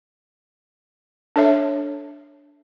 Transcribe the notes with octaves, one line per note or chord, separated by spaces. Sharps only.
D4 A4 C#5 E5